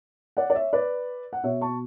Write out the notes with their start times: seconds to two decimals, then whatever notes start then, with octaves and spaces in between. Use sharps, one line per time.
0.37 D5 F#5
0.50 D5
0.55 C#5 E5
0.73 B4 D5
1.33 F#5
1.43 B2 C#5 E5
1.61 A5 C#6